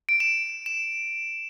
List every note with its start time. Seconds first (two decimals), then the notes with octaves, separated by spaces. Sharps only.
0.09 D7
0.20 E7
0.66 E7